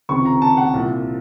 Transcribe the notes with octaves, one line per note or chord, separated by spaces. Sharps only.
C#2 C3 D#3 C#6
A#5
A5
F#5
C2 A#2